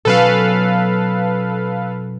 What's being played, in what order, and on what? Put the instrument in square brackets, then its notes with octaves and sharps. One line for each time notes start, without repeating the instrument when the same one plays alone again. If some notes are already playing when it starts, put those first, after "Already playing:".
[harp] B2 F#3 C#4 [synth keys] A4 B4 F5